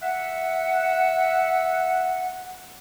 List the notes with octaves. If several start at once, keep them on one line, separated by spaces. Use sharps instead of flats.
E5 F#5